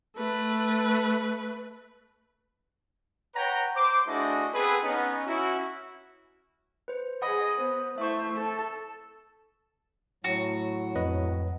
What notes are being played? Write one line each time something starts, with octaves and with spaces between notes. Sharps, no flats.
A3 B4
B4 C#5 F#5 G5 A#5
C5 D6
A3 D4 E4 F#4 G#4 D#5
B3 C4 G#4 A4 B4
B3 C#4 D#4
C#4 E4 F#4
B4 C5
G#4 D#5 F#5 B5 D#6
B3 C5
A3 E4 C5 E5 C#6
A4 A5
A2 F#3 F#4
F2 B4 D#5